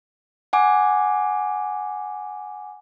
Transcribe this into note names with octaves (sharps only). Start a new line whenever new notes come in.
F#5 G#5 D6